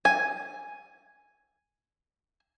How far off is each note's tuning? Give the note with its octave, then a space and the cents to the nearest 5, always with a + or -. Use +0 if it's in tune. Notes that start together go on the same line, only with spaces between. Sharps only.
G#5 +0